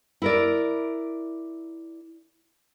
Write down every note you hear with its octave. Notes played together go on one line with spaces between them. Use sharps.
E4 A#4 D5